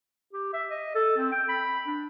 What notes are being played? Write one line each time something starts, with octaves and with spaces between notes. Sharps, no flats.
G4
E5
D#5
A4
C4
G5
B5
D4